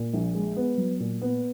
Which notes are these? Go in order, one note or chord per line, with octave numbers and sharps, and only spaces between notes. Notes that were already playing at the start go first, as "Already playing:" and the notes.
Already playing: A#2
A#1
G#3
B3
F#3
A#2
B3